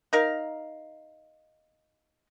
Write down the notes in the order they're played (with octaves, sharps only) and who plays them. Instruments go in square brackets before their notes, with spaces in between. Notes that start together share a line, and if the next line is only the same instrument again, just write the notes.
[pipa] D#4 A#4 F5